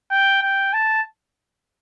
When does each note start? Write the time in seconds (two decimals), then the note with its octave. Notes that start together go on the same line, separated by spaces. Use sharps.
0.11 G5
0.42 G5
0.73 A5